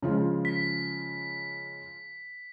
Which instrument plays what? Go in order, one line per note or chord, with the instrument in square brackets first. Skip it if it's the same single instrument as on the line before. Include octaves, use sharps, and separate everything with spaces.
[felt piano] C#3 F3 G#3
[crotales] B6